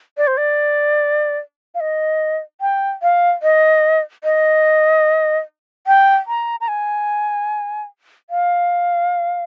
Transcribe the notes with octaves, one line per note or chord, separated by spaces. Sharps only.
D5
C5
D5
F5
D#5
G5
F5
D#5
D#5
G5
A#5
A#5
G#5
F5